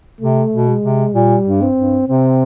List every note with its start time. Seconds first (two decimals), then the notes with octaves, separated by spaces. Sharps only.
0.21 C3 A3
0.53 B2
0.68 G#3
0.83 C3
1.14 A#2 G3
1.46 G2
1.61 C4
1.77 G2
2.08 C3 C4